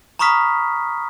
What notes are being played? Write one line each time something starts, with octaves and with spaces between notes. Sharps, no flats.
A#5 B5 C#6 D#6 F6 B6